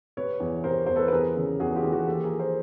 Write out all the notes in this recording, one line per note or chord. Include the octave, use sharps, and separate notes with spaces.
C3 B4 C#5
E2
C3 A#4 C5
E2 C5
A4 B4
B4
E2 G#4 A#4
C#3
E2 F#4 G#4
F4 G4
E3
F#4 G#4
D#2 G4 A4
G#4 A#4
F3
A#4 C5